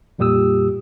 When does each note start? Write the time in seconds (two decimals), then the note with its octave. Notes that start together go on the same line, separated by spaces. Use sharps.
0.19 F2 A#2 G3 G4 D#6 E6